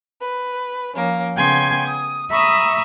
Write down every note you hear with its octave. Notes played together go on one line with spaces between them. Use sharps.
B4
F3 A#3 C#4
C#3 B3 G5 G#5 C6 G#6
D#6
E5 A#5 B5 C#6 D#6 E6